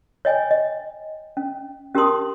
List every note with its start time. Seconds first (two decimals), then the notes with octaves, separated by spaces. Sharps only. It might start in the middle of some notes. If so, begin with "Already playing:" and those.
0.25 C#5 D#5 G5 G#5
0.51 D#5
1.37 C#4
1.94 C#4 G4 A#4 A5 C6 D#6